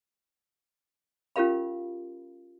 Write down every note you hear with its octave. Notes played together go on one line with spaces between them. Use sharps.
C#4 F4 G4 A#4 F5 B5